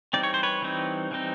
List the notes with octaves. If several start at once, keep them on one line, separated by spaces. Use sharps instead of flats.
E3 G3 C4 D#4 D5
C#5
C5
B4 C#5
E3 G3 C4 D#4
E3 G3 C4 D#4